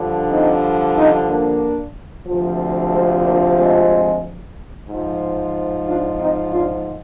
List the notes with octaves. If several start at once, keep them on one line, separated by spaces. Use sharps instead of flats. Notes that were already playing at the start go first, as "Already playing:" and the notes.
Already playing: G2 D3 F3
C4 D#4
C4 D#4
A#3 D4
D2 C3 F3
G#3 C4
A#3 D4
G#3 C4
G#2 F3
D4 F4
C4 D#4
D4 F4